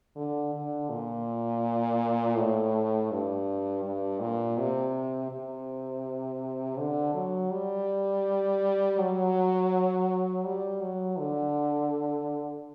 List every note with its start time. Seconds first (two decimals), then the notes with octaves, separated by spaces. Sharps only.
0.16 D3
0.54 D3
0.90 A#2
2.37 A2
3.11 G2
3.84 G2
4.20 A#2
4.58 C3
5.31 C3
6.78 D3
7.14 F#3
7.51 G3
8.98 F#3
10.45 G3
10.81 F#3
11.19 D3